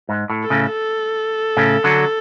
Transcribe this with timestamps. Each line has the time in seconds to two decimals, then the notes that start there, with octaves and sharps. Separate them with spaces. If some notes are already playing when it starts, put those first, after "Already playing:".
0.09 G#2
0.30 A2
0.43 A4
0.50 A2 C#3
0.72 A4
1.57 A2 C#3
1.84 D3 F#3